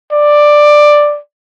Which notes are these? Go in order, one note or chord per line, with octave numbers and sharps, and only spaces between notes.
D5